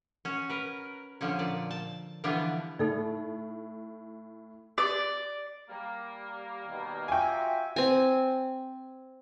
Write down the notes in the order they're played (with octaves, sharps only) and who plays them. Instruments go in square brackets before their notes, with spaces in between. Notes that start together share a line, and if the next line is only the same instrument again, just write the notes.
[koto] C#4 F#4
A#4 B4
D3 F3 C#4
A#2 D5
A5
D3 E3 F3 G3 B3 D4
[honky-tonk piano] A2 [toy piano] D#4 A4 D5
[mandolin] D5
[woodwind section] G3 A#3
[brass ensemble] D#2 B2 D#3
[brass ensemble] F4 F#4 E5 [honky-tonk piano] G5 G#5
[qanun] C4 G#5